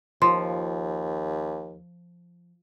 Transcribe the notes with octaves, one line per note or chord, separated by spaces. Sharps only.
D#2 F3 C6